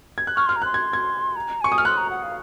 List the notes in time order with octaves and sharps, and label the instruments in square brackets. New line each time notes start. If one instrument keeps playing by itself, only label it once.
[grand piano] G#6
F#6
[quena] C#6 [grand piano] F6
[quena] C6 [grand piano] F6
[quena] A#5
[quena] C6 [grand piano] F#6
[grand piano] G#6
G#6
[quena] A#5
[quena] G#5 [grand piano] C#6
[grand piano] D#6
F6
[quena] C6 [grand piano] F#6
[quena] A#5
F#5
F5